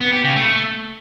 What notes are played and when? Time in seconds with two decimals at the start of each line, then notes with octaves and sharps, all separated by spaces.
0.01 B3
0.12 G4
0.24 C#3
0.36 A3